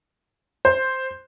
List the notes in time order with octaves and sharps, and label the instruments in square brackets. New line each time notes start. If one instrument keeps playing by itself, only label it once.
[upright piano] C5